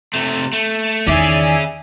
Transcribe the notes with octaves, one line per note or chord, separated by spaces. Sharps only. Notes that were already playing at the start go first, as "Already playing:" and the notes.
C3 A3
A3
E2 D#3 C#4 G#4 D5 E5 G#5